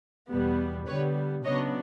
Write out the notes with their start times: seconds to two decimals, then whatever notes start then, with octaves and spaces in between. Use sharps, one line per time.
0.31 E2 B2 G3 B3
0.87 D3 G3 B3 B4 C#5
1.44 C#3 F#3 B3 D4 C#5 D#5